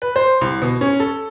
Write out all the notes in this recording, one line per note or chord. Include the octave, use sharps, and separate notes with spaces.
B4
C5
C2
B2
C#4
A4